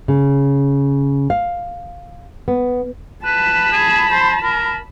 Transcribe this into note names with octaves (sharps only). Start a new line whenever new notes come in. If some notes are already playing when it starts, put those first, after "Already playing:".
C#3
F5
B3
B4 A5 B5
G#4
C5
A#4